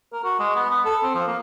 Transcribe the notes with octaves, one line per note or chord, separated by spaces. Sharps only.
A#4
F#4
G#3
B3
B3
A4
C4
F3
A#3